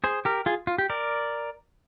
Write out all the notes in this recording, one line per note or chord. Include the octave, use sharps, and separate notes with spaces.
G#4 C5
G4 A#4
F4 G#4
F4
G4
A#4 D5